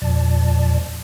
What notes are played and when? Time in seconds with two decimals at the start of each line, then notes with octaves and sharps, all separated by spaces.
0.02 E2 A#2 F3 D5 A5